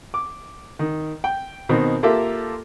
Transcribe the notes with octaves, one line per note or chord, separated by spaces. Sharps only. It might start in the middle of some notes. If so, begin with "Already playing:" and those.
D6
D#3
G5
B2 D#3 C4
A#3 F4 G4 A4 A#4 E5